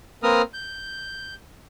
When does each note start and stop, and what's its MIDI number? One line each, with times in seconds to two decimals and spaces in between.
0.23 0.42 58
0.23 0.42 60
0.23 0.42 70
0.23 0.42 71
0.23 0.42 87
0.23 0.42 89
0.54 1.35 91